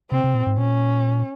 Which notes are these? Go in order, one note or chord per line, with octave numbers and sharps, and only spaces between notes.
C3 C4
C3
A#2
G#2
A#2 C#4